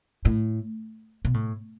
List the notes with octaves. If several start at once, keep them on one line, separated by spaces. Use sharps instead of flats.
A2
B2
A2